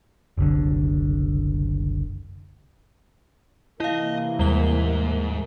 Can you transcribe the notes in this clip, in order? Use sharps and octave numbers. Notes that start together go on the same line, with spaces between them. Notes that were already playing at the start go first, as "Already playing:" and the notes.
F#1 C2 D3
C3 E3 A#3 E4 D#5 F5
D#2 G#2 G3 G7